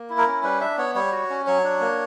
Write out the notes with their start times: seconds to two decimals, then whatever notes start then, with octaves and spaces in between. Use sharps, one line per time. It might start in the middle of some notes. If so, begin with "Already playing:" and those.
Already playing: A#3
0.10 E4
0.18 A#4
0.26 C#4
0.43 G3 B4
0.61 D4 E5
0.77 B3 C#5
0.95 G3 C#5
1.12 F#4
1.30 C#4
1.47 F#3 C#5
1.64 D4
1.81 A#3